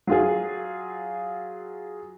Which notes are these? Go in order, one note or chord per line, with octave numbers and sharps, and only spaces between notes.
F#3 F4 G#4